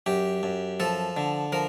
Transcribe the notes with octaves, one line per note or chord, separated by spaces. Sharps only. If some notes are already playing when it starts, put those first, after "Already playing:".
F#2 G4
F#2
F3 A4
D3
F3 A#4